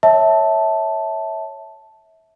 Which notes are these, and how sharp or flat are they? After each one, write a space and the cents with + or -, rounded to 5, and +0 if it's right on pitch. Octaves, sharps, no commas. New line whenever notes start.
C#5 +0 E5 -25 A5 +0